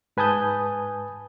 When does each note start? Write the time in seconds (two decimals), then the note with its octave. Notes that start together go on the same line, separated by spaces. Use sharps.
0.17 G#2 B4 G#5 A5 D#6 G6